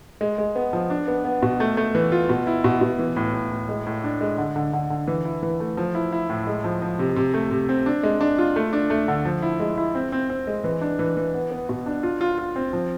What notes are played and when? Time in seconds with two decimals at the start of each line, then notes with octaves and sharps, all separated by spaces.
0.21 G#3
0.38 G#3
0.56 B3
0.73 F3
0.90 D4
1.08 B3
1.25 B3
1.42 B2
1.60 A3
1.77 A3
1.95 E3
2.12 F4
2.29 B2
2.47 E4
2.64 B2
2.81 B2
2.99 E3
3.16 A2
3.34 A2
3.51 A2
3.69 G#3
3.86 A2
4.04 D4
4.21 G#3
4.38 D3
4.56 D3
4.73 D3
4.90 D3
5.08 E3
5.25 E4
5.43 E3
5.60 A3
5.77 F3
5.95 E4
6.12 E4
6.29 A2
6.47 G#3
6.64 F3
6.82 F3
6.99 C3
7.16 C3
7.34 A3
7.51 C3
7.69 C4
7.86 D4
8.03 G#3
8.21 D4
8.38 F4
8.56 A3
8.73 D4
8.90 A3
9.08 D3
9.25 F3
9.42 E4
9.60 G#3
9.78 E4
9.95 C4
10.12 C4
10.30 C4
10.47 G#3
10.64 E3
10.81 D4
10.99 E3
11.17 E3
11.34 B3
11.51 B3
11.69 B2
11.86 D4
12.03 F4
12.21 F4
12.38 F4
12.56 C4
12.73 F3